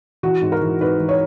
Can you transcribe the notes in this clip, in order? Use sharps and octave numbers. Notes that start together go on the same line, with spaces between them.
E3 F#4
G#2
A#4
E3
G#2 B4
E3
C#5